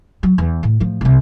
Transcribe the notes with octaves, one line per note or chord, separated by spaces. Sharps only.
F#3
E2
A2
A2 F3
C2 C3